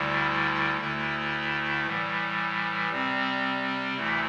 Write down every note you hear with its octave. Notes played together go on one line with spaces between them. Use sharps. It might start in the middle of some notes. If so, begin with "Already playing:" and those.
Already playing: D2 D3 G3 E4
D2 D3 A3 E4
A2 E3 G3
C3 G3 C4
D2 C3 E3 A3 E4